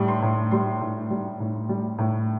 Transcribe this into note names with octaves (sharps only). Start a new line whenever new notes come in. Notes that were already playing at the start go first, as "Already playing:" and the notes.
Already playing: A2 G3
C6
A2
G3 C6
A2
G3
A2
G3
A2